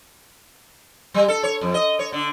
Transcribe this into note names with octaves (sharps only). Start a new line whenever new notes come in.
G3
A4
C#5
F2
D#5
C#5
D3